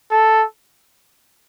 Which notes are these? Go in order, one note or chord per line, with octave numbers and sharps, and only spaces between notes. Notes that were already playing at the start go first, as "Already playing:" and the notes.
A4